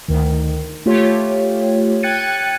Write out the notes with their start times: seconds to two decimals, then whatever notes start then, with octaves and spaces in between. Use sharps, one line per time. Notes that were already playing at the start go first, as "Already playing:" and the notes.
0.08 D2 D#3
0.86 A3 F4 G4 C#5
2.03 G5 F#6 G#6 A6 C#7 D#7